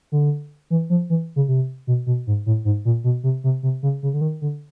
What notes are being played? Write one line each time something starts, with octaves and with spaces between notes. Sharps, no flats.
D3
E3
F3
E3
C#3
C3
B2
B2
G#2
A2
G#2
A#2
B2
C3
C3
C3
C#3
C#3
D3
D#3
D3